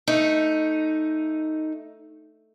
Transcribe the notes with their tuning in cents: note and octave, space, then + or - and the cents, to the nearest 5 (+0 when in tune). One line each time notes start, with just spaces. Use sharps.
A3 +0 D#4 +5